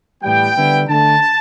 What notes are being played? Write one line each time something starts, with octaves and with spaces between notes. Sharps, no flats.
A2 E3 G3 B3 G5
D3 G3 B3 E4
D3 A3 D4 A5